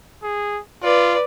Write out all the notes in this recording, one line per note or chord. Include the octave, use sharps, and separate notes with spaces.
G#4
F4 B4 D5